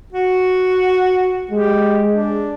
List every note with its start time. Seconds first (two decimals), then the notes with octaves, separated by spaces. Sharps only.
0.12 F#4
1.51 G#3 G4
2.09 D4